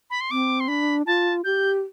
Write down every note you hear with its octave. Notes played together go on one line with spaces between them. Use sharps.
B5
C6
C4 D6
C6
D4 B5
F4 A5
G4 G6